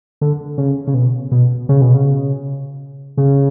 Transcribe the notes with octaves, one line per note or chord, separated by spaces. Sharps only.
D3
C#3
C#3
B2
B2
C#3
B2
C#3
C#3